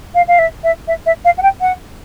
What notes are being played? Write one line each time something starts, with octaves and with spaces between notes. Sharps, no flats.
F5
F5
E5
E5
E5
E5
F5
F#5
G5
F#5